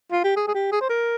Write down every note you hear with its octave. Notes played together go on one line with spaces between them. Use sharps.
F4
G4
G#4
G#4
G4
G#4
C5
A#4